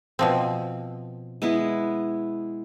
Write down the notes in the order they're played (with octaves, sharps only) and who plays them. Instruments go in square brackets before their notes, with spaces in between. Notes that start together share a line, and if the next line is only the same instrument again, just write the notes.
[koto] B2 F3 C4
[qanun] G#3 B3 E4